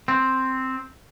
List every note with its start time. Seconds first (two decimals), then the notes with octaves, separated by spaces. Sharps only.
0.08 C4